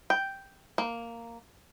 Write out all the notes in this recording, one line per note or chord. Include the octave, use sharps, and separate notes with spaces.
G5
A#3